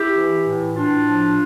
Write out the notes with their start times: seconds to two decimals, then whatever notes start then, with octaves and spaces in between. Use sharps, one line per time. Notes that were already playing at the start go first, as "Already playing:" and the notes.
Already playing: E4 G4
0.15 E3
0.45 A2
0.76 A2 D4 F4
1.07 F3